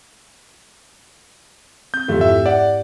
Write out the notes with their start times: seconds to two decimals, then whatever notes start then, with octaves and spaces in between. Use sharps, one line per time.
1.94 C4 G6
2.08 F2 G#2 A3 G4
2.21 E4 G4 E5
2.46 D5 F#5